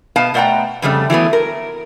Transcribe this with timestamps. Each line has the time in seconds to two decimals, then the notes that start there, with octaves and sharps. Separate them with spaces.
0.16 B2 B3 F5 A5
0.34 B2 A3 D5 F#5 G5 A#5
0.82 F2 C#3 G3 A3
1.10 E3 F#3 A3 B3
1.33 A#4